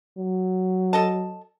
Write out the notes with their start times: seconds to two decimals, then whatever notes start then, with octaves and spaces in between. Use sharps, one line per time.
0.18 F#3
0.93 A4 D#5 A5